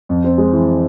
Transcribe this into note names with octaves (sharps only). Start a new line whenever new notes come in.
F2
C4
G#3
E3